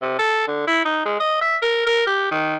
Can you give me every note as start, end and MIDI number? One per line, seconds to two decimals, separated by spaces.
0.02 0.15 48
0.19 0.48 69
0.48 0.67 50
0.67 0.82 64
0.85 1.04 63
1.05 1.20 56
1.20 1.40 75
1.41 1.57 76
1.62 1.83 70
1.87 2.05 70
2.07 2.27 67
2.31 2.57 51